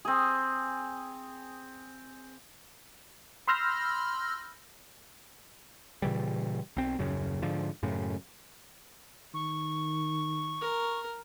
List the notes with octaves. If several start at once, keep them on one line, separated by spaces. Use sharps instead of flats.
C4 G#4
B5 C6 E6 F6 G6 A#6
A#2 C#3 E3 G3
B1 C4
D#1 F#2 C#3
G#2 D3 F3
F#2 A2 C#3
D#3 C#6
A#4